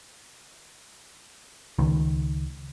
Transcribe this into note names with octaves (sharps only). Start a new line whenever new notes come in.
C#2 D#3